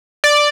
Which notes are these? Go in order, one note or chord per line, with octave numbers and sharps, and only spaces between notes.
D5